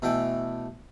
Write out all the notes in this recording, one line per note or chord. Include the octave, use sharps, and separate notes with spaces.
B2 E3 A3 G5